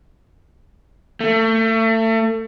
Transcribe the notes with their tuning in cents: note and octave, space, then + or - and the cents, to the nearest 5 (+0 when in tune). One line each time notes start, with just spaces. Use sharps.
A3 +30